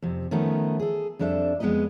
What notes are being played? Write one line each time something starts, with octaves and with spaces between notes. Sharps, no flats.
F2 C3
D#3 F3 A3 B3 C#4 D#4
G#4 A4
F2 G3 D4 A4 E5
F2 G#3 B3 G4 B4 D#5